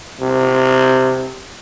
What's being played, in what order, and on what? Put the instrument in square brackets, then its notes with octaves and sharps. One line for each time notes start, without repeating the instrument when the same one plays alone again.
[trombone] C3